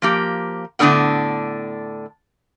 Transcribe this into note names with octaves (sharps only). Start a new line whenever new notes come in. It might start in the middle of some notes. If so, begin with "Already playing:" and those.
F3 A#3 G4
A2 D3 B3 D4 A#4 F#5